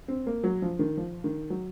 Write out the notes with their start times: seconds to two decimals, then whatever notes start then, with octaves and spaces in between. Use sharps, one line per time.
0.08 C4
0.27 A#3
0.43 F#3
0.62 F3
0.79 D#3
0.97 F3
1.24 D#3
1.50 F#3